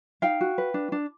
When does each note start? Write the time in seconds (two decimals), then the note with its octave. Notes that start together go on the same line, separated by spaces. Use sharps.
0.22 D#4 F5 G5
0.41 F#4
0.58 B4
0.74 D4
0.92 D4